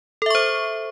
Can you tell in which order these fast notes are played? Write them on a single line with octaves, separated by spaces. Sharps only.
A4 E5 C#6 C5